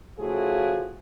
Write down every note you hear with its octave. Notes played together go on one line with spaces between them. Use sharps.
C#3 F3 A3 E4 F#4 G#4